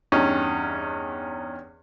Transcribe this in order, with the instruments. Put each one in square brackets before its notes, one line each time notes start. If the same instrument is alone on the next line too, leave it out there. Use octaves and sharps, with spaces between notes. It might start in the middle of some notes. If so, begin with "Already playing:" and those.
[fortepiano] E2 G2 C#4 D#4